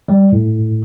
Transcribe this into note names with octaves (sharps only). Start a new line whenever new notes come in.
G3
A2